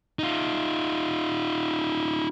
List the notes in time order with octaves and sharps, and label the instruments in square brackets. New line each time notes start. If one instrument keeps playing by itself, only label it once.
[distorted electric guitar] D#4 F4